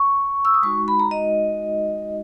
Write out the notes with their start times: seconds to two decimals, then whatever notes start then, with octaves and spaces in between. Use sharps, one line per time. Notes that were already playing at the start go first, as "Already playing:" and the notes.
Already playing: C#6
0.45 E6
0.54 D#6
0.63 G#3 D#4 F#4 C#6
0.88 B5
0.99 A#5
1.11 D#5